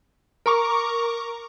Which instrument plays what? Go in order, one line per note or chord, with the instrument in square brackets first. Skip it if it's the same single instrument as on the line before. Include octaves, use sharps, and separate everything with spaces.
[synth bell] A#4 A#5 C#6 D6